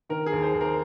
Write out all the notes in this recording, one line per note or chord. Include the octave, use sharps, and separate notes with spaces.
D#3 A#4
G#4
D#2
C5
D#2
A#4